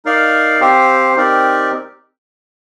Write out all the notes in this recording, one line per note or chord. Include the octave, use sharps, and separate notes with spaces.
D#4 A#4 D5 F5
C4 G4 C5 F5
C4 D#4 G4 A#4 D5